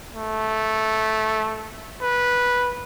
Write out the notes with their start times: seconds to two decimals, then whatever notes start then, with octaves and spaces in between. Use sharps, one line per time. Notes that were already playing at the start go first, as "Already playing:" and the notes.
0.15 A3
2.01 B4